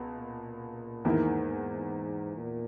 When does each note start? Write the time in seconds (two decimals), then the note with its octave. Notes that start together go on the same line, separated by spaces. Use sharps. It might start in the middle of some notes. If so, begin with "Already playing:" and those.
Already playing: C#2 B2
0.17 A#2
1.05 E2 G#2 D#3 A#3 E4 A#4
2.37 A#2